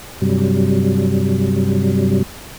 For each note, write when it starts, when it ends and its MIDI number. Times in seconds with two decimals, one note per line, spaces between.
0.21 2.23 43
0.21 2.23 48
0.21 2.23 54
0.21 2.23 55